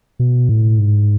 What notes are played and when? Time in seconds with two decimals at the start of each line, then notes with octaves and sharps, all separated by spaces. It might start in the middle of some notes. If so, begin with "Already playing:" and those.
0.19 B2
0.49 A2
0.78 G#2